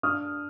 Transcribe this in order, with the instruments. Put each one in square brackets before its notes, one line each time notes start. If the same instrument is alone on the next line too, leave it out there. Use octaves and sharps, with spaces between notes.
[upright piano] D4 D#6 F6